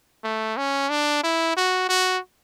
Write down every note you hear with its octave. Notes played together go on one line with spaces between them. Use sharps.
A3
C#4
D4
E4
F#4
F#4